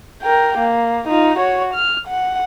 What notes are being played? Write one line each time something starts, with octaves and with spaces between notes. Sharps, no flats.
A#4 G5
A#3
D#4 F4
F#4 C#5
F6
F#5